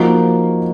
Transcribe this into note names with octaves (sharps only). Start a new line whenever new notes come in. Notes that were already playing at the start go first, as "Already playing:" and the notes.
Already playing: F3 A#3 D#4 F#4